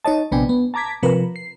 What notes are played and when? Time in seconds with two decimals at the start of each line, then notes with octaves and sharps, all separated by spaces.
0.05 D#4 C#5 D#5 A5
0.32 A#1 C3 B3 D4 G5 G#5
0.49 B3
0.74 A5 A#5 D6 G#6 B6
1.03 C3 F3 A#4 B4
1.36 C7